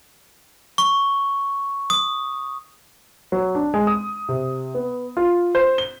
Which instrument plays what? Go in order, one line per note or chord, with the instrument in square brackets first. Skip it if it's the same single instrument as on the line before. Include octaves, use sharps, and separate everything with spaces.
[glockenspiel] C#6
D#6
[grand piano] F#3
D4
G#3
D#6
C3
B3
F4
C5
G7